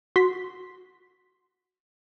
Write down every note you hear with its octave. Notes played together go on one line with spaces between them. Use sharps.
F#4 C6 B6